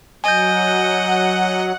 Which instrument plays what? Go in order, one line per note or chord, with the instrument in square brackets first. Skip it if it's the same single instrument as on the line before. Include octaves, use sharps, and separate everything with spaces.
[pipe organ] F#3 [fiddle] D#5 [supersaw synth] F#5 [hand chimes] G#5 G6